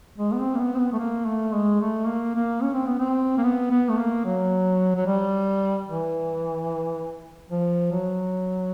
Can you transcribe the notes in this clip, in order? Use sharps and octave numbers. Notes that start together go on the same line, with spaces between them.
G#3
B3
C4
A#3
B3
C4
B3
A3
A#3
A3
G#3
A3
A#3
A#3
C#4
C4
B3
C4
A#3
B3
B3
A3
A#3
F#3
F#3
G3
E3
F3
F#3